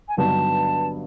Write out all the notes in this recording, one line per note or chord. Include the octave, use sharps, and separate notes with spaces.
G#5
G2 D3 F#3 B3 D#4 A5